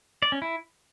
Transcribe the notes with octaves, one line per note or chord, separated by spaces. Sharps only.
D5
C#4
E4